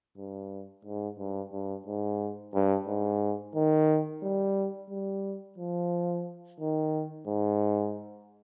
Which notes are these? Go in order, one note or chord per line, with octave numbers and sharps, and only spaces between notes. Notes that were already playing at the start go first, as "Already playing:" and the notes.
G2
G#2
G2
G2
G#2
G2
G#2
D#3
G3
G3
F3
D#3
G#2